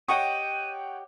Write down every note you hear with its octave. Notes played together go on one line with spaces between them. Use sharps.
G4 C#5 D#5 F#5 G5 C#6 D#6 D#7